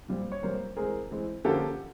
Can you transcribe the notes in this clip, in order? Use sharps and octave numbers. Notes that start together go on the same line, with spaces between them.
A#2 G3 C4
C#5
A#2 G3 C4 A#4 C5
E3 G#3 C4 G#4 A#4
E3 G#3 C4
D3 F3 A#3 C#4 G4 A4